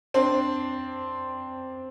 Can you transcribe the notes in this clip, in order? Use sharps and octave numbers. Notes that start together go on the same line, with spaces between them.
C4 D4